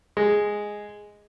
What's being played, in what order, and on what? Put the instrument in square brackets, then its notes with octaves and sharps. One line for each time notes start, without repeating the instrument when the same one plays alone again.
[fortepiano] G#3